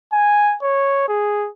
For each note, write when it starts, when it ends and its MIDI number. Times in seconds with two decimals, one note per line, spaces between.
0.13 0.56 80
0.63 1.08 73
1.09 1.49 68